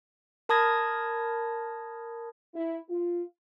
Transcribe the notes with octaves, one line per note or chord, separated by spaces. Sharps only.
A#4 A5 B5 D#6 G#6 A#6
E4
F4